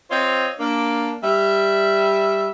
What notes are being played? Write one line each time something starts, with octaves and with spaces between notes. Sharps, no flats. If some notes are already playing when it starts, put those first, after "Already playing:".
C4 F4 C5 C#5 D#5
A#3 D4
G3 E5